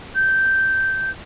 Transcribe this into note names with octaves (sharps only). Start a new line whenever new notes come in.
G6